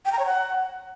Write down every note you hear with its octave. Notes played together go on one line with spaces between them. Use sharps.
G5
A#5
C#5
F#5